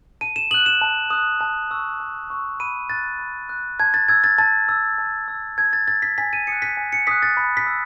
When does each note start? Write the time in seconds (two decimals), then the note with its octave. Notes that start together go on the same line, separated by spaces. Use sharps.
0.21 A5 D#7
0.36 E7
0.51 D#6 F#7
0.54 F#6
0.66 E7
0.81 A5
1.10 D#6 F#6
1.41 A5
1.71 C#6 E6
2.00 A5
2.30 C#6 E6
2.60 B5 D#7
2.90 F#6 A6
3.19 B5
3.49 F#6
3.80 A5 G#6
3.94 A6
4.08 E6 G#6
4.24 A6
4.38 A5 A6
4.69 E6
4.98 A5
5.28 E6
5.58 A5 G#6
5.73 A6
5.88 E6 A6
6.02 B6
6.18 G#5 B6
6.33 D#7
6.47 D#6 F#6 C#7
6.62 B6
6.77 G#5
6.92 C#7
7.07 D#6 F#6 B6
7.22 A6
7.37 B5
7.57 B6
7.67 E6